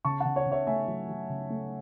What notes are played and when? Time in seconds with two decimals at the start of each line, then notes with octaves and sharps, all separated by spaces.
0.05 C#3 A5 C#6
0.20 C#3 F#5 A5
0.36 C#5
0.46 C#3
0.52 C#5 E5
0.67 A3 E5 G#5
0.88 F#3
1.09 F#3
1.29 C#3
1.50 A3